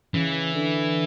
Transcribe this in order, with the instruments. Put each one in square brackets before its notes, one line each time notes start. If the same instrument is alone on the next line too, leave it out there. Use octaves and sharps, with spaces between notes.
[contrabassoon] C#3 [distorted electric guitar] E3
[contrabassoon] D3